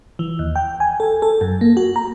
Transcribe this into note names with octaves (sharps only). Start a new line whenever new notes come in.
E3
D#2
G5
G#5
A4
A4
F#2
A#3
F#4
A#5